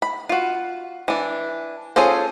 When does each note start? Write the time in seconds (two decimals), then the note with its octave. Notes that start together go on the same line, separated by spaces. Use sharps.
0.02 B5
0.29 F4 F#4
1.08 E3 D4
1.96 C#4 F4 G#4 A4 C5